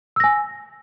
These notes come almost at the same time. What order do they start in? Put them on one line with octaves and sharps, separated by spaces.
E6 A#6 G#5